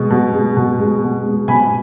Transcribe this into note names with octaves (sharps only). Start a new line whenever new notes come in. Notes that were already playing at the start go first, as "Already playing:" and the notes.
Already playing: B2 G#3
B2
G#3
B2
G#3
B2
G#3
B2 G#5 B5